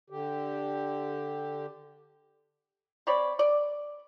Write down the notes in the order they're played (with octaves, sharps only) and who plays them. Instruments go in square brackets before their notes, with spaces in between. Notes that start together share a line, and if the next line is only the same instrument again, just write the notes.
[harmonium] D3 G4
[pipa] C4 C#5 D5 B5
D5